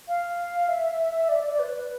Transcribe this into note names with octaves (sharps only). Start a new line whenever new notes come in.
F5
E5
D5
D5
D5
B4